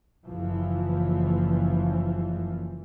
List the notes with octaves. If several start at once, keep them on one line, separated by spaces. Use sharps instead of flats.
F#1 E3 F3